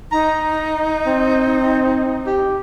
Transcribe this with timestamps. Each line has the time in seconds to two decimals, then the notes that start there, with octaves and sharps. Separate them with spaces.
0.12 D#4 A#5
1.06 C4
2.26 G4